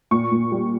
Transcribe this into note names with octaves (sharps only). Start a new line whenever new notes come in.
A#2 C#6
A#2
G3